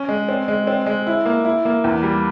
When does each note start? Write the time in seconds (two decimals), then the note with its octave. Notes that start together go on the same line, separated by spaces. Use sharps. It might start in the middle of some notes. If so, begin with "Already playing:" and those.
Already playing: C#4
0.09 G#3
0.29 C4
0.48 G#3
0.67 C4
0.86 G#3
1.07 E4
1.25 A#3
1.45 E4
1.65 A#3
1.84 E2
2.03 G3